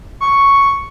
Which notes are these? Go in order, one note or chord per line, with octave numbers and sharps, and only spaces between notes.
C#6